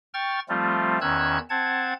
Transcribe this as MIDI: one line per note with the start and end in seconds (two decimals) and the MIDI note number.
0.14 0.40 79
0.14 0.40 85
0.14 0.40 89
0.14 0.40 93
0.49 0.98 53
0.49 0.98 55
0.49 0.98 57
0.49 0.98 60
0.49 0.98 65
1.01 1.38 40
1.01 1.38 51
1.01 1.38 61
1.01 1.38 88
1.01 1.38 90
1.01 1.38 92
1.50 1.93 60
1.50 1.93 78
1.50 1.93 81
1.50 1.93 92